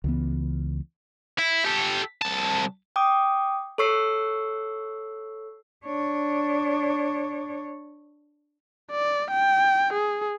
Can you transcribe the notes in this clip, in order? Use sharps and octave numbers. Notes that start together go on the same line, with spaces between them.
C#2 E3 B3
E4
G4 A4
C2 A5
G5 D6 D#6
A4 C#5 C#6 E6 C7
D4 C#5
D5
G5
G#4